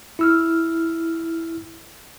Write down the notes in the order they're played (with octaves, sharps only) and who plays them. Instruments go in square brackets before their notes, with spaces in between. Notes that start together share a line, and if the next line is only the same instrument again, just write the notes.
[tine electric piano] E4 E6 F6